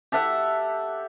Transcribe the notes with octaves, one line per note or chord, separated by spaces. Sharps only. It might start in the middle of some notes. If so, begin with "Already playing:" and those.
G4 A4 E5 F#5